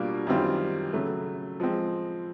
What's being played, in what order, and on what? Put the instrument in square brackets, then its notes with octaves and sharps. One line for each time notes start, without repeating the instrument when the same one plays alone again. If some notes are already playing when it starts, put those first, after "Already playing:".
Already playing: [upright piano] B2 G3 A#3 D4 F4
F#2 D#3 G3 C4 F4
C#3 F#3 A3
F3 G#3 C4